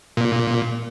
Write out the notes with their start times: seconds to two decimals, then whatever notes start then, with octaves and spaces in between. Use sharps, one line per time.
0.17 A#2